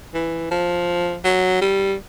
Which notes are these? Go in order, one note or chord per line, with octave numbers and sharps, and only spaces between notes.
E3
F3
F#3
G3